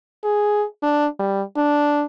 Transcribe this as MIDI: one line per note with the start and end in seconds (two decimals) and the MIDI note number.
0.24 0.65 68
0.83 1.07 62
1.19 1.42 55
1.57 2.05 62